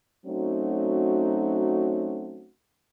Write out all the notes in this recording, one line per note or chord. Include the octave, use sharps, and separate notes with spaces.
F#3 A3 C4 C#4 D#4 F#4